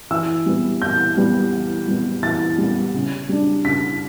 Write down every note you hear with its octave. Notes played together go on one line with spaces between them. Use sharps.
E3 E6
G3 B3
E3 G6
G3 B3
E3
G3 B3
E3 A6
G3
B3
C#3
G3 D4
C#3 B6